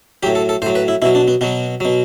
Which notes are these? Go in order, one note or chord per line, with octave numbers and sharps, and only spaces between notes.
A2 F#3 G4
A4
A4
A2 F#3 C5
B4
E4
B2 F#3 E4
D4
B3
B2 F#3 B3
B2 F#3